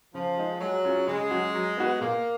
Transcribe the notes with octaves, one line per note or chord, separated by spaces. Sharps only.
C#3 F3
G#3 D#4
F#3 G#3
C#4 F4 G#4
C#3 G#3
F#3 C#4 F#4
F#3
B3 D#4 F#4 B4
A#2 A#3